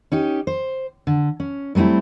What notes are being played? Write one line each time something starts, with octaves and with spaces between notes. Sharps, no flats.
C#4 D#4 G4
C5
D3
C#4
F#3 G3 A3 C4 E4